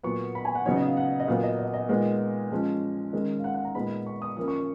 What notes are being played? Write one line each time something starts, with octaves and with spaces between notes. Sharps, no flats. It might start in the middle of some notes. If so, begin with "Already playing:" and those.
A#2 F#3 B3 C#6
B5
G#5
F#5
C#3 F#3 B3 D#4 C#5
D#5
F5
F#5
D#5
A#2 F#3 B3 F5
D#5
D#5
D#5
A#2 G#3 B3 D#4
F3 G#3 C#4
D#3 G#3 C#4
F5
F#5
F#5
A#5
A#2 G#3 B3 D#4 B5
C#6
D#6
F3 A#3 C#4 D#6
C#6